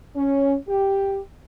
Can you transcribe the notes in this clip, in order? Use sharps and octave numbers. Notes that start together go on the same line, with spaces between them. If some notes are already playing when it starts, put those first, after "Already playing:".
C#4
G4